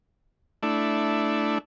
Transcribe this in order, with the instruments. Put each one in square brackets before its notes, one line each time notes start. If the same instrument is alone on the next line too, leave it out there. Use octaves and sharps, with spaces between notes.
[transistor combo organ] A3 D4 E4